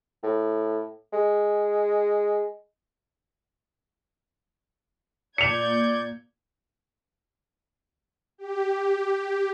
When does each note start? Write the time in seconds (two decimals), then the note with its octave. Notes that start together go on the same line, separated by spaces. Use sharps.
0.23 A2
1.13 G#3
5.38 A#2 D5 G6 G#6 C#7 F7
8.38 G4